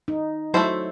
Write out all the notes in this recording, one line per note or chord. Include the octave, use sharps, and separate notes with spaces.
D#4
F#3 A3 C#4 E4 C5